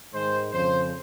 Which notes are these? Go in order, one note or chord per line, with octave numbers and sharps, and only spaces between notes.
G#2 D#3 G#3 C5
F2 C#3 F3 C5